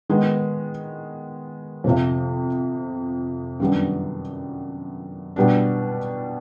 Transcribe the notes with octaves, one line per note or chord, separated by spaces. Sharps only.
D#3 G#3 B3
F2 C3 F3
F#2 D#3 G3 B3 D4
B2 G3 B3 D4